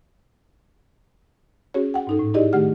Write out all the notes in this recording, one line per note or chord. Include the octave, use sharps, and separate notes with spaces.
C#4 F#4 G#4 C#5
F#5 G5
G#2 D#4 A4
A2
D#4 E4 G4 G#4 D5 D#5
D#3 A3 G4 G#4 F#5 F6